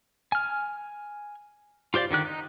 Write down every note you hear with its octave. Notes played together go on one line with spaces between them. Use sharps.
G#5 F6
F4 G4 C5 D5 F5
D3 D#3 G4 F#6
D#4